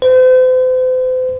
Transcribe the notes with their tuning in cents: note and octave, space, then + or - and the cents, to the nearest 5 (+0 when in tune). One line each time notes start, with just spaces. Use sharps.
C5 -40